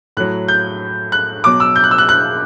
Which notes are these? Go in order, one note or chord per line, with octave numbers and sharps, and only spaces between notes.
A2 F#3 F#6
G6
F#6
B2 F#3 D6
E6
G6
F#6
E6
F#6
F#6